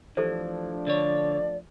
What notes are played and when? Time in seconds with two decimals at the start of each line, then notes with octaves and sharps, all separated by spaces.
0.17 E3 F3 A3 D4 G4 A4 C5
0.87 D3 C#5 D5